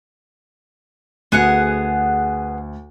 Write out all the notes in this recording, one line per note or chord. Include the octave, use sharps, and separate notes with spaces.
D2 B3 G#4 F#5